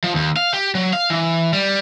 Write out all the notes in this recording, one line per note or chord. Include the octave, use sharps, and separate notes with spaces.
F3
D#2
F5
G4
F#3
F5
E3
G3